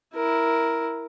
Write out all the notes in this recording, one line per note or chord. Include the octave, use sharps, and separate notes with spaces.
E4 A#4